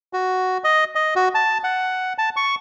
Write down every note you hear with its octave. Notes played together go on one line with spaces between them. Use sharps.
F#4
D#5
D#5
F#4
A5
F#5
A5
C#6